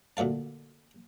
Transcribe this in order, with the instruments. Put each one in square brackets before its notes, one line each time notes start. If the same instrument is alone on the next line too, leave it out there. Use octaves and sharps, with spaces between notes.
[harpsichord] D2 A#2 A3 F5 A5